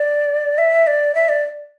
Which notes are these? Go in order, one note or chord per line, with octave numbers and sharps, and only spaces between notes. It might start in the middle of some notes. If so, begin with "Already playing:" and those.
Already playing: D5
E5
D5
E5
D5